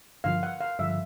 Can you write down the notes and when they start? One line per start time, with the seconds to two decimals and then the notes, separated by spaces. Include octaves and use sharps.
0.24 G2 D3 F3 F5
0.43 F#5
0.61 F5
0.79 G2 D3 F3 E5